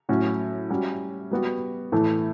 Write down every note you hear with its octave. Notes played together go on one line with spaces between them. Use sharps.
A2 F#3 C#4 F#4
G3 C#4 F#4
G3 B3 F#4
A2 E3 A3